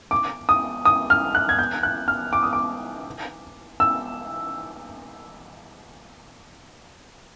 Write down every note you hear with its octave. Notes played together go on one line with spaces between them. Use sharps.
D6
D#6
D#6
F6
F#6
G#6
G6
F#6
F6
D6
D#6
D6
E6